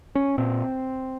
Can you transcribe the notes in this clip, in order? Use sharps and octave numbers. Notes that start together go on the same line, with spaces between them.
C#4
A#2 C4